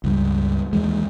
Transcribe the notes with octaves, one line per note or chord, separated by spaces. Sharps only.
C#2 G2
D#2 E3 G#3